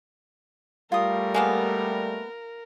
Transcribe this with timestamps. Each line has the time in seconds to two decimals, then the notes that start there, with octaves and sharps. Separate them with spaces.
0.92 G3 A3 F4 A#4 D#6
1.34 G#3 A#3 B3